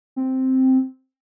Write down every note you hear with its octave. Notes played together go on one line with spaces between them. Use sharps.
C4